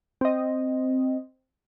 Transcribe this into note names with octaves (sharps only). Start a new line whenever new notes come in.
C4 D#5